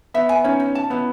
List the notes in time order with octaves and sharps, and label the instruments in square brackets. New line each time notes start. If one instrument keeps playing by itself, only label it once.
[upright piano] B3 [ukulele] E5
[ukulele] G#5
[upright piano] C#4 [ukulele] D#4
[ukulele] D#4
A5
[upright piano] B3 [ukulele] E4